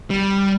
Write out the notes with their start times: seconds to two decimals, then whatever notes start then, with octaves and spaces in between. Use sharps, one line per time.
0.10 G3